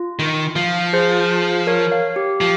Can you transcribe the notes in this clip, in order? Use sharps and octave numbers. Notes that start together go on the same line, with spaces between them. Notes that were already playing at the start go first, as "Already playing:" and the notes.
Already playing: F4
D#3
F3
G#4 C5
A#4 C#5
C#5 F5
G4
F3 G4